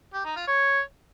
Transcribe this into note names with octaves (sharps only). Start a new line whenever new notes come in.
G4
D#4
F4
C#5